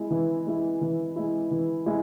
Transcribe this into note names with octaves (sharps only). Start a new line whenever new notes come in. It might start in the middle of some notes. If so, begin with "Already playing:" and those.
Already playing: G#3 E4
E3
G#3 E4
E3
G#3 E4
E3
G#3 E4